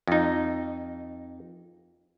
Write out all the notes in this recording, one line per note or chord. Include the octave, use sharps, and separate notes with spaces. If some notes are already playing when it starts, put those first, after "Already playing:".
F2 D#4